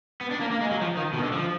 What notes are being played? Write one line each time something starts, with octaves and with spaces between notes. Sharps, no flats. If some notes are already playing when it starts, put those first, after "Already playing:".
B3
D4
A#3
A#3
G#3
F#3
F3
D#3
B2
D#3
D3
F3